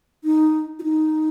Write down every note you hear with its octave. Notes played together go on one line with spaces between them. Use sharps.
D#4
F4
D#4